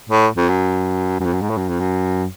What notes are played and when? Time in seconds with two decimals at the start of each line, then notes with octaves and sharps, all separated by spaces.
0.10 A2
0.37 F2
0.49 F#2
1.20 F#2
1.25 F2
1.34 F#2
1.41 G#2
1.50 A2
1.57 F#2
1.68 F2
1.80 F#2